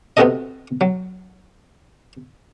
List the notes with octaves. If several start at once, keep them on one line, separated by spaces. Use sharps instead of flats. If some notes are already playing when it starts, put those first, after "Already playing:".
C3 B3 C4 F#4 A4 D#5
F#3